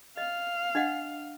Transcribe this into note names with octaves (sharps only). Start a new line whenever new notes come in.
D#5 F5
D4 D#5 F#5